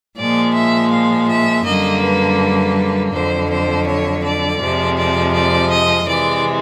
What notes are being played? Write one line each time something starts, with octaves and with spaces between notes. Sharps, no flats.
A#2 F3 G#3 D5
E5
F5
E5
F#2 D3 G3 A#3 D#5
B4
F2 D3 F#3 C5
C5
C#5
D5
F2 C3 F3 G#3
D5
D5
D#5
C3 E3 G#3 D5